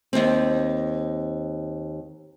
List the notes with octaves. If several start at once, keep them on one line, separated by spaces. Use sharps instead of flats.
D#2 C4